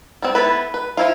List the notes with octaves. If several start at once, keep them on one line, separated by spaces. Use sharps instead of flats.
G3 B3 C4
B3 E4 A4 B4
B4
F3 E4 F4